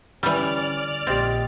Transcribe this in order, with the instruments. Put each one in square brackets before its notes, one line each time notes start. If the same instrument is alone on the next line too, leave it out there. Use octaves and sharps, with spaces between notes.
[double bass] D3 C#4 [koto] E3 G3 [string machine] D5 F6
[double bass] A#1 [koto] C4 [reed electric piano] G4 D#5 A6